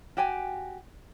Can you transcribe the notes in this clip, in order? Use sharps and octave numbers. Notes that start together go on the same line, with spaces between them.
F#4 G4 G5 G#5